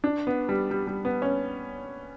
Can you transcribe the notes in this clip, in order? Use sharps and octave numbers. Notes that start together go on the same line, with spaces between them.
D4
B3
G3
G3
G3
B3
C#4